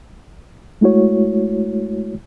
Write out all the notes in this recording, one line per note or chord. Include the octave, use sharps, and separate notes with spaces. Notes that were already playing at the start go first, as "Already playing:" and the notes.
G#3 A3 E4 F#4 C#5